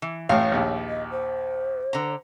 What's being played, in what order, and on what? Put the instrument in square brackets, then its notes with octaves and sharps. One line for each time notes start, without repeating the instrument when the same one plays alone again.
[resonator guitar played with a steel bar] E3
[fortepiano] A1 A2 [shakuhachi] C#5 [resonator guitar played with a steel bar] F5
[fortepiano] A#1 D#2
[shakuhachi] D#5
C5
[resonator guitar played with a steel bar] D3 A#5